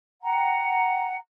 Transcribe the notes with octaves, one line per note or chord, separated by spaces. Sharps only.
F#5 G5 A#5